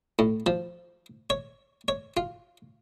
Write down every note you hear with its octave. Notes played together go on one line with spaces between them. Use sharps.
A2
F3
C#5
C#5
F4